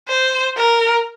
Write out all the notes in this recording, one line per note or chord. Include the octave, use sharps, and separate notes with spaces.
C5
A#4